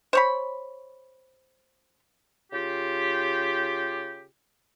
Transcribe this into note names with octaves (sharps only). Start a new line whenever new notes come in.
C5 C#5 B5
C#3 F4 G4